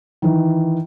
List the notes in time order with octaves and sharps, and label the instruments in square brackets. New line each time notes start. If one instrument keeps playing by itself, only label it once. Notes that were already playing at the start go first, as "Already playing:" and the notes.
[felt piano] D#3 E3